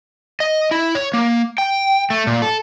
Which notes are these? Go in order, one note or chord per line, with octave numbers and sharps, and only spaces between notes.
D#5
E4
C#5
A#3
G5
A3
A#2
A4